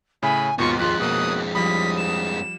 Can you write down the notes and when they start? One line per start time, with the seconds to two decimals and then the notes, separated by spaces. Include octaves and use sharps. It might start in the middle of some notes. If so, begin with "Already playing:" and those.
0.22 A2 C#3 E4 G#5 B5
0.59 D#2 G#2 B2 F4 C#6
0.79 F2 G#3 F4 F#6
1.00 B2 A#3 D#6
1.55 F3 G3 B5 D#6 B6
1.97 E7